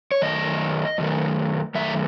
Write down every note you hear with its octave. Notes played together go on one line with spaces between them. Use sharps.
C#5
F#2 D#3 A3 D#5
F#2 D#3 A3
F#2 D#3 A3 E5